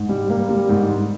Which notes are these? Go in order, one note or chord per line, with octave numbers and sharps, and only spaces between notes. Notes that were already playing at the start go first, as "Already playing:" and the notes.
Already playing: G#2
G3
A#3
G3
G#2
G#2